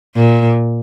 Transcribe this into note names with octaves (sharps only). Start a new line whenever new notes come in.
A#2